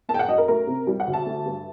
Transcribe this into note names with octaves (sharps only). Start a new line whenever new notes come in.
A#3 A5
G5
F#5
F#2 D#5
A#4
A3 A#4
C3
G3
F#5
D2
A5
A3
G2